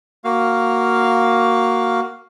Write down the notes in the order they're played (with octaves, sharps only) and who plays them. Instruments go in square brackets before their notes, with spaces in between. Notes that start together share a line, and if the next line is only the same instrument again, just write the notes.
[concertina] A#3 F#4 F5